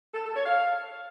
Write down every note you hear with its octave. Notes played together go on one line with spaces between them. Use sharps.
A4
A4
C#5
F5